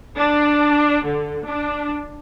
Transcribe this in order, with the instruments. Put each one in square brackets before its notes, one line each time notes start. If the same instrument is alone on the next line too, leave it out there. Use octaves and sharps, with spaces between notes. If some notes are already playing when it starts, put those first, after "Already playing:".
[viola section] D4
D3
D4